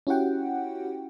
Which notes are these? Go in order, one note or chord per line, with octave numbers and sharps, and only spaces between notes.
C#4 E4 F#4 G4 F#5 G5